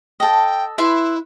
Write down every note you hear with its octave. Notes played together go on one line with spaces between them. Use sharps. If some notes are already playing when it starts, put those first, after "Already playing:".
A4 D#5 G5
E4 B4 E5 C6